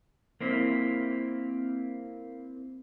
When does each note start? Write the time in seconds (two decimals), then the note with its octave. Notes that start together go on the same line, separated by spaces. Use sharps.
0.41 A#3 C4 E4